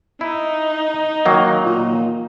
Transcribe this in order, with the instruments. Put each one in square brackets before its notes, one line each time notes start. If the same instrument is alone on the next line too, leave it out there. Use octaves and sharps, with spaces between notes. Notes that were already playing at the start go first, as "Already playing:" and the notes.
[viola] D#4 [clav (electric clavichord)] E4
[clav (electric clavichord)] D#3 F#3 A#3
[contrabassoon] A#2